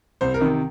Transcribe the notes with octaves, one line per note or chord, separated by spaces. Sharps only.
C2 C5
A#4
C3 D#3